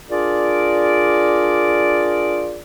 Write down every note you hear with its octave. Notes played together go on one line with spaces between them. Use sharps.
D4 F4 G#4 A#4 D5